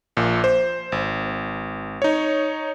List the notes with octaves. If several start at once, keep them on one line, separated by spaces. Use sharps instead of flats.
A#1 A#2
C5
G#1
D#4 C#5